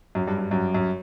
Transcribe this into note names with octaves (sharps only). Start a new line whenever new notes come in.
F#2
G2
G2
F#2
F#2